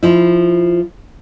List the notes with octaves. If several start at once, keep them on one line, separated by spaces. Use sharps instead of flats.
F3 E4